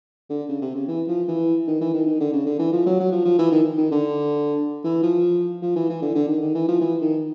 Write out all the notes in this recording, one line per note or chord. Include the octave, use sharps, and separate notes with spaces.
D3
C#3
C3
C#3
E3
F3
E3
D#3
E3
D#3
D#3
D3
C#3
D3
E3
F3
F#3
F#3
F3
F3
E3
D#3
D#3
D3
E3
F3
F3
E3
E3
D3
D3
D#3
D#3
E3
F3
E3
D#3